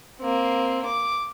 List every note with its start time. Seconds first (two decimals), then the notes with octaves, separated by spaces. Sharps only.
0.21 A#3 C4
0.86 D6